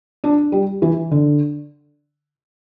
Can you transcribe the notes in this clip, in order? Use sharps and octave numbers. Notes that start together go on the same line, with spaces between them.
D4
G3
E3
D3